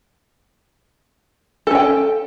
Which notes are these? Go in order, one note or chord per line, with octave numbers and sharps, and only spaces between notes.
C#4 A4 G5